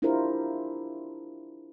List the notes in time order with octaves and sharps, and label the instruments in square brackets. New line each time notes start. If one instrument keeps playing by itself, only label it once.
[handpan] D4 E4 F4 G4 A#4 C5